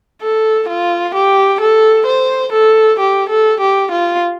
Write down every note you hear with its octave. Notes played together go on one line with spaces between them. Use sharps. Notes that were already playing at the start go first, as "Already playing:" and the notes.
A4
F4
G4
A4
C5
A4
G4
A4
G4
F4